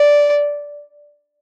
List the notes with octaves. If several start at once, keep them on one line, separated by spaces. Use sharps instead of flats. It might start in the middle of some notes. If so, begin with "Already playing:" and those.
Already playing: D5